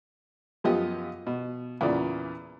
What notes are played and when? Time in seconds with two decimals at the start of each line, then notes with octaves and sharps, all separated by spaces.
0.64 F#2 F3 B3 F4 G4 D#5
1.27 B2
1.81 E2 A#2 C#3 D5